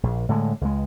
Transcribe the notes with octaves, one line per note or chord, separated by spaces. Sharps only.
A#1
A2 D3 F#3 G#3
C#2 G#3